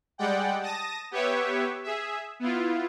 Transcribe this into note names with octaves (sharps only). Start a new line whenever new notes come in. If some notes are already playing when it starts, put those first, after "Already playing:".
G3 G#3 D5 F#5 G5
A5 D#6 A#6
B3 G4 B4 C#5 E5
G#4 E5
B3 E4 F4